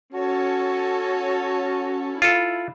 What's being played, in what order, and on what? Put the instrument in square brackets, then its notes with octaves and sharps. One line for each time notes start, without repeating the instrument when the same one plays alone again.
[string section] C#4 A4 C#5 [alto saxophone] F#4
[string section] E4 [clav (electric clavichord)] F4 A4